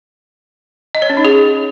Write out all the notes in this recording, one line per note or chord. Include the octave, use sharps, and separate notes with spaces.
D#5
C#5
C#4
D#4
G#4